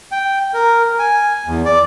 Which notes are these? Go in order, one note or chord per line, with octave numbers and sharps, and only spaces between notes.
G5
A#4
G#5
E2
D5